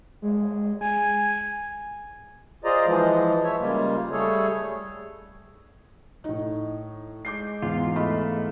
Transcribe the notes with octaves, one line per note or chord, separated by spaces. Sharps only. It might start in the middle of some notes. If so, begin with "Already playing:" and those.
G#3
G#5
F4 G#4 C5 D5 D#5 A#5
E3 F3 G#3
C#5 E5
C#3 G3 G#3 A#3 F4
G3 A3 G#4 A4 C#5
A2 D#4
G#3 D6 G6 C7
E2 G#2 F4
A3 D#5 F5 B5